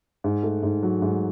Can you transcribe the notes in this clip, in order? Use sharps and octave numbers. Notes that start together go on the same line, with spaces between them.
G#2
A3
G#2
F#3
G#2